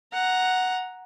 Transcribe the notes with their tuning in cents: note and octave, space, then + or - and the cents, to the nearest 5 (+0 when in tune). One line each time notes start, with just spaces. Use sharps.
F#5 +0 A#5 +5